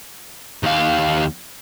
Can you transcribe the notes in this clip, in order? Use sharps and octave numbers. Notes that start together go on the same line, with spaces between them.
D#2 F5